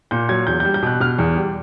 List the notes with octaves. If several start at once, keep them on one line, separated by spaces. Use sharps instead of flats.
A#2 G6
F#3 G#6
E2 G6
G6
G3
G6
B2 F#6
B2 F6
E2
G3